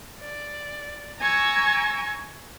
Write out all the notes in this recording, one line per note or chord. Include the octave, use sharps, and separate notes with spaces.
D5
G#5 A#5 C#6 E6 G#6